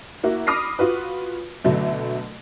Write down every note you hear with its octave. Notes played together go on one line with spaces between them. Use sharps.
A#3 E4 F#4
B5 D6 D#6 F6 A#6 C7
F4 F#4 B4
B2 D3 F#3 A3